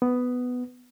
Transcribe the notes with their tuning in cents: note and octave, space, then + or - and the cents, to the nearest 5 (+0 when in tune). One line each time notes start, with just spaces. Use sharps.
B3 +10